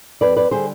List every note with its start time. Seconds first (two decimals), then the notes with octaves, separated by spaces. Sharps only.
0.21 F2 B4 D5
0.36 B4 D5
0.51 D3 G3 G#4 C5